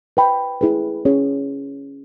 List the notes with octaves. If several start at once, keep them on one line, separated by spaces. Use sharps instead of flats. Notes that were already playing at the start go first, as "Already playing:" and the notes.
B4 G5 B5
E4 G#4 B4
C#4 G#4 C#5